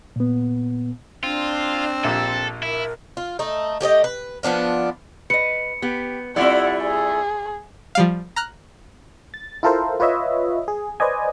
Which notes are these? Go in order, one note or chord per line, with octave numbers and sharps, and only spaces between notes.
A#2 B3
C4 D4 F4
A#1 A#2 G4 A4
E4 A#4
F4
A3 D#4
A3 G4 D5 D#5
B4
F3 B3 D4 F4
B4 D#5 C#7
B3 G4
G3 A3 C4 E4 F4 D5 F#5
G#4
F3 G3 F5
A#5 F6 F#6
A6
E4 F4 A4 A#4 C5
F4 B4 C#5 D#5 E5
G#4
B4 C5 D5 D#5 G#5